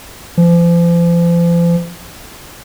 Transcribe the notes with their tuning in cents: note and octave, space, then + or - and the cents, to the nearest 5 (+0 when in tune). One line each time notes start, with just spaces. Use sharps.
F3 -40